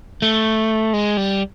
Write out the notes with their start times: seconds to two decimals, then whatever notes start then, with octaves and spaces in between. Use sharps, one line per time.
0.22 A3
0.93 G#3
1.17 G3